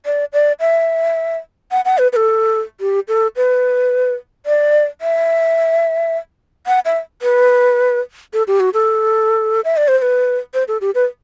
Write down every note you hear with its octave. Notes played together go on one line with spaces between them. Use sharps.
D5
D5
E5
F#5
F#5
B4
B4
A4
G4
A4
B4
D5
E5
F#5
E5
B4
A4
G4
F#4
A4
E5
D5
C5
C5
B4
C5
A4
G4
B4